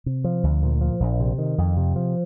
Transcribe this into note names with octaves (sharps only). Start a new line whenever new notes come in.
C3
F3
D2
A#2
F3
A#1
C3
D#3
F2
C3
F3